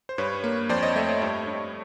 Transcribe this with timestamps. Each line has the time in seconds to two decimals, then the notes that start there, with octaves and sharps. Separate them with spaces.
0.09 C5
0.18 G2 B4 C#5
0.44 A#3
0.69 F2 C5 D5
0.83 C#5 D#5
0.96 A3 D5 E5
1.08 C5 D5
1.21 G2 C#5 D#5
1.47 G2